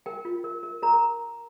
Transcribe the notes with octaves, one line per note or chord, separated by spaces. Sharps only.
A#4 G5
F4
A#4
A#4
A#4 A#5